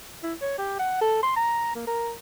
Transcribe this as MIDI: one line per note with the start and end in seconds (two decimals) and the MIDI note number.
0.23 0.34 64
0.41 0.56 73
0.58 0.75 67
0.79 1.00 78
1.01 1.18 69
1.23 1.34 84
1.36 1.74 82
1.75 1.84 58
1.87 2.13 70